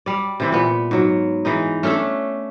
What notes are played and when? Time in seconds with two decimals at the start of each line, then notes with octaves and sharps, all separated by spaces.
0.06 G3 D5
0.40 C3 E3 C4
0.52 A#2 B3
0.91 G#2 F#3
1.45 E3 G#3 D#4
1.83 A3 C#4 D4 A4